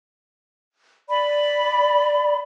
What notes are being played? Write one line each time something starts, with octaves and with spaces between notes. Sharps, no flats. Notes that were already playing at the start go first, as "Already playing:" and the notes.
D5 B5